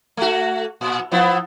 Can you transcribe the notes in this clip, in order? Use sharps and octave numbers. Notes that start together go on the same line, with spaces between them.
A3 F#4
A#2
F3 B3 E4